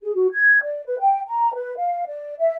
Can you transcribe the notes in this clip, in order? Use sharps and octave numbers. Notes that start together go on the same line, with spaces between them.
G#4
F#4
G#6
D5
B4
G5
A#5
B4
F5
D5
E5